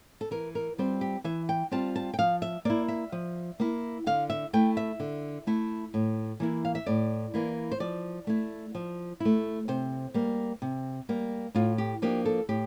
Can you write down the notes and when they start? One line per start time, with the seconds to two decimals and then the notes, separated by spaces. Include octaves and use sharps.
0.21 A4
0.31 E3 A#4
0.55 A#4
0.78 G3 C4 F4 C5
1.01 G4
1.24 E3 E5
1.49 G5
1.71 G3 C4 F4 A5
1.96 A5
2.14 G5
2.19 F3 F5
2.42 E5
2.65 A#3 E4 D5
2.88 E5
3.12 F3
3.60 A#3 E4
4.07 D3 F5
4.30 E5
4.53 A3 E4 G5
4.77 E5
5.00 D3
5.47 A3 E4
5.94 A2
6.40 E3 A#3 E4
6.65 F5
6.75 E5
6.86 A2 D5
7.34 E3 A#3 E4
7.72 C5
7.80 F3 D5
8.27 A3 E4
8.75 F3
9.20 A3 E4
9.68 C3 C5
10.14 G3 A#3
10.62 C3
11.09 G3 A#3
11.55 A2 F4
11.78 G4
12.02 F3 A#3 D4 G4
12.25 A4
12.49 A2 G4